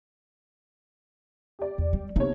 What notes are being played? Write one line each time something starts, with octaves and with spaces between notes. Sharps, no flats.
G4 D5
E2
G3
B1 C3 A#3 D#4 C#5